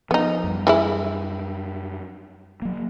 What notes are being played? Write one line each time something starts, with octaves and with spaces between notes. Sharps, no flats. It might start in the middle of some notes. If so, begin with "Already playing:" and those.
F3 B3 D#4
F#2 G3
E3 G#3 E4
F#3 A#3